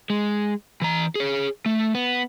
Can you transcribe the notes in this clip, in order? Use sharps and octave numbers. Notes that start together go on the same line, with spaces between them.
G#3
E3 A#5
G#4 C#5
A3
B3